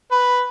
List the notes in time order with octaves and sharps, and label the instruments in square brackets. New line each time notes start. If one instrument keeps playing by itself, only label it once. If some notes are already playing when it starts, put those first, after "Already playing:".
[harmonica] B4